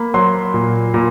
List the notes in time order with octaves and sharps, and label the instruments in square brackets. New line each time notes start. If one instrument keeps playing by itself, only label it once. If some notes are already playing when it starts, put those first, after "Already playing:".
Already playing: [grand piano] A#3 B5
F#3 C6
A#2
A#2